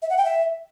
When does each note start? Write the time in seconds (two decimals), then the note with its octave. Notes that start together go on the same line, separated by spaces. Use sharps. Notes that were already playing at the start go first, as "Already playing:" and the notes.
0.02 E5
0.10 F#5
0.17 G5
0.25 E5